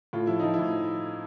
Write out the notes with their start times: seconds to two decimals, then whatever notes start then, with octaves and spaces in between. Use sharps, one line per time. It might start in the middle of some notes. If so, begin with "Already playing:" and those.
0.13 A2 F4
0.27 F3 E4
0.40 F3 D#4
0.54 E4
0.59 A2